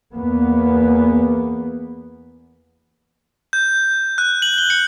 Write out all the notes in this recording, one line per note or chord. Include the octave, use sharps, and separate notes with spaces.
E2 A#3 B3
G6
F#6
F#7
G7
C#7